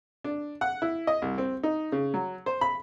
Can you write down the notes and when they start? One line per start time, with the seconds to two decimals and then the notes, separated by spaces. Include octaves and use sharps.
0.24 D4
0.61 F#5
0.82 E4
1.07 D#5
1.22 C2
1.38 C4
1.63 D#4
1.92 C#3
2.14 F#3
2.46 C5
2.61 B5